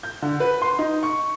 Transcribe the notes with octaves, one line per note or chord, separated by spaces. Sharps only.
G6
D3
B4
C6
D#4
C#6